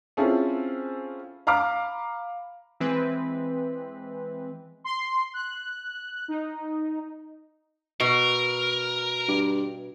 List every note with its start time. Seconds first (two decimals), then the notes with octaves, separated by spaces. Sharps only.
0.17 C4 C#4 E4 F4 G#4 A4
1.47 F5 A#5 B5 D6 F6
2.80 E3 G#3 C4 B4
4.84 C6
5.33 F#6
6.28 D#4
8.00 B2 A#4
9.28 G2